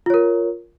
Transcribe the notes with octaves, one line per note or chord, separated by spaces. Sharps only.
F4 A#4 C#5